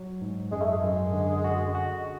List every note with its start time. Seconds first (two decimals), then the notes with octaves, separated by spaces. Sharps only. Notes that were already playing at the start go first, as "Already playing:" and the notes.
Already playing: F#3
0.21 G#2
0.52 F#2 G#3
0.62 A3
0.72 G#3
0.83 F#2
1.13 D3
1.44 F#4
1.75 F#4